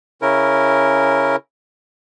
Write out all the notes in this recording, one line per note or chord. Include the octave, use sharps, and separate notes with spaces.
C#3 C#4 E4 A#4